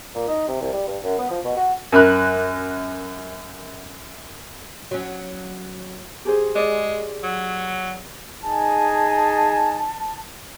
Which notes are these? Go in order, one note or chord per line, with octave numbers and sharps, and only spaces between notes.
A#2
D#4
C3
C2
G3
G2
F#2
B3
F3
B2
F#4
F#2 A#4 B5 F#6
F#3 C#4
G4 G#4 C5
G#3 D5
F#3
D#4 G#4 G#5 A5